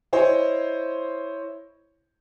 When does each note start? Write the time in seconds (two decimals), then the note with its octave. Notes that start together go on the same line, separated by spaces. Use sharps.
0.13 E4 C5 C#5 D#5